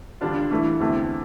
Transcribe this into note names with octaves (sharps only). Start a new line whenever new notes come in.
D3 G3 D4 F4
E3 A3 E4
E2 D3 A3 C4